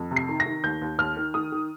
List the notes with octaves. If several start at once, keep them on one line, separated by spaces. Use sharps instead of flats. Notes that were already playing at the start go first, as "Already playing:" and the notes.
Already playing: F2
C3
C7
D#3
A#6
D#3
D#2 G6
D#2
D#2 F6
D#3
D#3 D#6
D#3